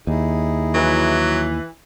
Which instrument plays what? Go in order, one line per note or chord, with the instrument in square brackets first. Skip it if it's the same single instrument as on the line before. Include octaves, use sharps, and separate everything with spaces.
[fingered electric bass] D#2 [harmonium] D#4 E4 G#4
[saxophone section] E3 [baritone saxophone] F#3